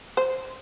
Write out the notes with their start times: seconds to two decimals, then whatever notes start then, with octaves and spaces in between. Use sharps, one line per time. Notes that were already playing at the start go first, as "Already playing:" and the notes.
0.17 C5